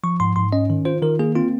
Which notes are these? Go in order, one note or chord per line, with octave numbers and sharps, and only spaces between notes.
F3 C#6
G#2 C6
G#2 C6
C#4 D#5
D#3
F4 C5
D#3 A#4
A#3 G#4
C4 F4